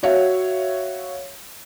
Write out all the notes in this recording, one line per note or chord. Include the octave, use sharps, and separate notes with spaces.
F#4 C#5 E5 F5